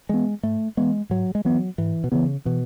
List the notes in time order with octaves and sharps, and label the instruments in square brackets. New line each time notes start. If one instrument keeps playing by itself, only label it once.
[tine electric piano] E3 B3 [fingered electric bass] G#3
[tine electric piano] G#2 [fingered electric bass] A3
[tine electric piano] E3 B3 [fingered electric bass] G#3
[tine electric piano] G#2 [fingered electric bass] F#3
[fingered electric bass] G#3
[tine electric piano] E3 B3 [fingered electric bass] F#3
[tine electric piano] G#2 [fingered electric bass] E3
[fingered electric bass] B2
[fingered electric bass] C#3 [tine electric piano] E3 B3
[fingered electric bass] B2 [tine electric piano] E3